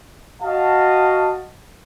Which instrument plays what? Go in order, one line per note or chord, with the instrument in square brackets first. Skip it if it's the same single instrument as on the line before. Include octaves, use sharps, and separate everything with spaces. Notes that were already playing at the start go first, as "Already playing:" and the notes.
[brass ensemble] F#4 D#5 F5 A5